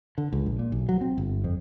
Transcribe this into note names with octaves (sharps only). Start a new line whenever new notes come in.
D3
C#2
A#1
A#2
B1
F#3
C4
G1
F2